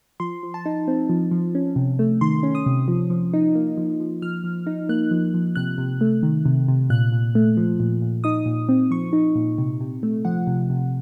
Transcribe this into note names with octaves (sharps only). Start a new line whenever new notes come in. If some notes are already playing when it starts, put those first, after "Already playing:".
F3 C6
F3
A5
D#4
C4
F3
F3
C#4
C3
A3
D#3 C6
C#4
D#6
C3
F3
F3
D#4
A#3
F3
F3
F3 F6
F3
D#4
A#3 F#6
F3
F3
C3 F#6
C3
A3
D#3
C3
C3
A#2 F#6
A#2
A3
F3
A#2
A#2
D#4 D#6
A#2
C4
F3 C#6
D#4
A#2
C3
C3
A3
F3 F#5
C3
C3